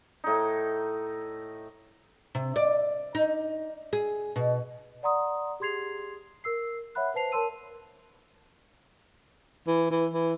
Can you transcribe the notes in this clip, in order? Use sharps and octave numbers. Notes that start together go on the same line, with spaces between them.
A2 D#4
C3
D5
D#4
G#4
B2
D5 F#5 A#5 C6 D#6
G4 G#4 C6 G#6 C7 F7
A#4 E6 C7
C#5 E5 F#5 B5 F#6
B4 C5 A5 C7 F7
A#4 C#5 A5 C6 E6 D#7
E3
E3
E3